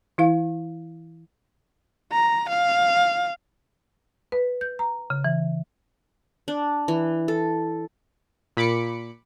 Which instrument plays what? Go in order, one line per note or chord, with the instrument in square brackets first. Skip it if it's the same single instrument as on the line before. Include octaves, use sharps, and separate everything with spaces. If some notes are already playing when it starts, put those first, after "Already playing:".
[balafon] E3 E4 F5
[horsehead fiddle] A#5
F5
[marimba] B4
G6
A#5
C#3
E3
[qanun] D4
E3
A4
[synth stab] A#2 B5 D6 C#7